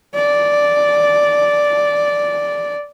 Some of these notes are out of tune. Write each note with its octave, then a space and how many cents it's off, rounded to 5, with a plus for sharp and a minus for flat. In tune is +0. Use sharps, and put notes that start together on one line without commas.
D5 -5